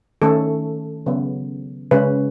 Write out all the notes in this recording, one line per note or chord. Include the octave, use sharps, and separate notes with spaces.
D#3 A3 C#4 A4
C#3 F#3 B3
C#3 G#3 C#4 B4